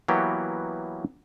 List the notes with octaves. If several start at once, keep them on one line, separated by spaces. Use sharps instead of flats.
E3 F#3 A#3 B3 F#4 G4